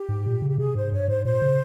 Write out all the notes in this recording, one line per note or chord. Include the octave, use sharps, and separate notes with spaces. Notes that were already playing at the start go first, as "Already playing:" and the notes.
Already playing: G4
G#2
A#2
C#3
G4
C3 G#4
G#2 C5
G2 C#5
G#2 C5
A#2 C5
C#3